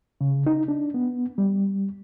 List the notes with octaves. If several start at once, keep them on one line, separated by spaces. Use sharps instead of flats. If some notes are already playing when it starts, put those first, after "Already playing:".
C#3
D#4
D4
B3
G3